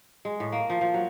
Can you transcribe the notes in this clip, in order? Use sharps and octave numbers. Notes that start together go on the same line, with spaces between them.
G#3
A2
A#3
F3
F3
F#3